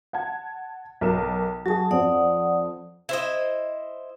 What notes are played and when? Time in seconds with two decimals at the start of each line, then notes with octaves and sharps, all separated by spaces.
0.13 F#5 A5 G#6
1.01 B1 A#4 E7
1.66 F#3 F#4 G#4 A5
1.91 F2 C4 D5 F#5 D#6
3.09 E4 C5 D#5